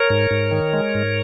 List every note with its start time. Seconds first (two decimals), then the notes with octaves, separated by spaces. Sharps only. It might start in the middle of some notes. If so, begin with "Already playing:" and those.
Already playing: A#4 C#5
0.10 G#2
0.31 G#2
0.51 D#3
0.73 G#3
0.95 G#2